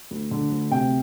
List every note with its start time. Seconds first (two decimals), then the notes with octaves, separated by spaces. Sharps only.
0.11 D2
0.31 D3
0.51 D2
0.71 C3 G5